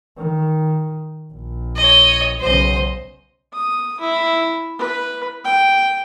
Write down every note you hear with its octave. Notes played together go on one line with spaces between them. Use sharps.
D#3
A#1
C#5 D#5
B1 C#3 C5 D#5
D#6
E4
B4
G5